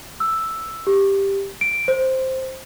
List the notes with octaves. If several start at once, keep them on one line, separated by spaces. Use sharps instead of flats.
E6
G4
D7
C5